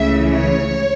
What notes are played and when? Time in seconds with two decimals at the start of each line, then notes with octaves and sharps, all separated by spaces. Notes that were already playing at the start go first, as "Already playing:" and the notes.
Already playing: C#2 C#3 E3 A3 E5
0.32 C#5